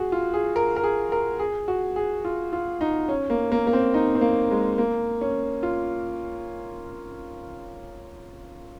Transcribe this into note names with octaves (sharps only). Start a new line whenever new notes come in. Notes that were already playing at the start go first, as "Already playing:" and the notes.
Already playing: F#4 G#4
F4
G#4
A#4
A#4
G#4
A#4
G#4
F#4
G#4
F4
F4
D#4
C#4
A#3
A#3
A#3
C4
D#4
C4
A#3
G#3
A#3
C#4
F4